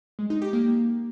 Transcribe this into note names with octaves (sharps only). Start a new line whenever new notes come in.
G#3
D#4
G4
A#3